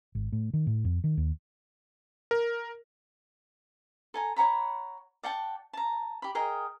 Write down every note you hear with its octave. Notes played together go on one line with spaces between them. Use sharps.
G#1
A2
D#3
A2
F2
D#3
D#2
A#4
A4 G#5 A#5
C#5 F#5 A#5 B5
D5 F#5 G5 A5
A5 A#5
G4 B5
G#4 A#4 D#5 G5